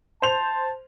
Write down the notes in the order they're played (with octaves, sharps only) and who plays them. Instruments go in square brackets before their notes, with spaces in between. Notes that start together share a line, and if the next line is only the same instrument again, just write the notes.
[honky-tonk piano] C5 F7 [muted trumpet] A5